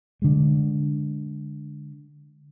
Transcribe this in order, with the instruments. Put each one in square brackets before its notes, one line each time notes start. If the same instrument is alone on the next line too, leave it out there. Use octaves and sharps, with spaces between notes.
[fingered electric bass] D3 G#3